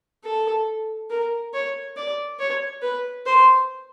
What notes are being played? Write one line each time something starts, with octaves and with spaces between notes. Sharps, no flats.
A4
A#4
C#5
D5
C#5
B4
C5